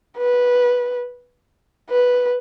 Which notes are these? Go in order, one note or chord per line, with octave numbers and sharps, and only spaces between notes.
B4
B4